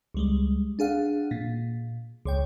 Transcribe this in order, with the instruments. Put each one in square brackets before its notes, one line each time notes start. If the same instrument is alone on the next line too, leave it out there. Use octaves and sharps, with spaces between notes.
[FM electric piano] C#2 G3 G#3
D4 G#4 F5 F#5
A#2
C#2 C#5 G5